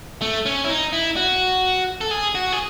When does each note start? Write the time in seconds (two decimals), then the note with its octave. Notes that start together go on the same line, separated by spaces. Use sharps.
0.22 A3
0.46 C#4
0.64 E4
0.69 D#4
0.93 E4
1.16 F#4
2.01 A4
2.11 G#4
2.35 F#4
2.52 G#4